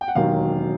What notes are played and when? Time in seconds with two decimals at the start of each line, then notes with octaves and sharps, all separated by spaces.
0.01 G5
0.08 F#5
0.15 E1 D#2 D#3 F#3 F5